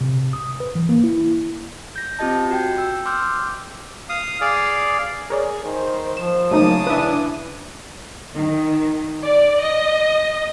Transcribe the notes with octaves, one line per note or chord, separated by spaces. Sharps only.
C3
D#6
B4
E3
A#3
E4
G6 A#6
C4 F4 G4 D#5 A5
F#4 G5 G6
G5 E6
C6 D6 E6 F6 G6
F5 D#6
G#4 D5 F5
G#4 A#4 C#5 D5
D#3 C5
F3 E7
C#3 F#3 A3 A#3 D#4 A5 D#6
E3 D4 B4 E5
D#3
D5
D#5